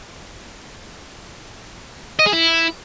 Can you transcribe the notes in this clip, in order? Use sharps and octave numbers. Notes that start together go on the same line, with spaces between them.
D#5
G#4
E4